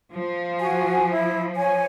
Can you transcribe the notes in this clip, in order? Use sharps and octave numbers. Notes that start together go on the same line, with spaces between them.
F3
F#4 G#5
E4
C#5 G#5